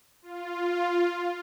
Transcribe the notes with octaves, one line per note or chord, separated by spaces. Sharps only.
F4